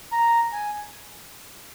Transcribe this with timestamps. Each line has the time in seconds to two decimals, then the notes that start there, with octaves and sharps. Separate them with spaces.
0.12 A#5
0.52 G#5